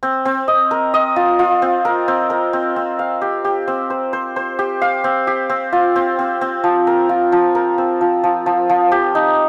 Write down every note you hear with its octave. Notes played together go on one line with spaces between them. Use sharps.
C4
C4
D#5
A#4
D#5
F4
F4
C4
A#4
C4
A#4
C4
C4
F5
G4
G4
C4
C5
C5
C5
G4
F5
C4
G4
C4
F4
C4
C4
C4
F3
A#4
F4
F3
A#4
C4
F3
F3
F3
F3
G4
D#4